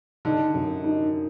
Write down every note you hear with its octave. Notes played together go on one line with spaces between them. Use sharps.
D3 D#4
F#2
D#4